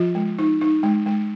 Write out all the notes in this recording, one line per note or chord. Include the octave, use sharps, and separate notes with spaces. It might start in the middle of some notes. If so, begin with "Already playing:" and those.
Already playing: F3 F4
G#3
D#4
D#4
G#3
G#3